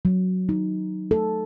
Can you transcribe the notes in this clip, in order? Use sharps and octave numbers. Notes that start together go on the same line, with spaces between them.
F#3
D#4
A4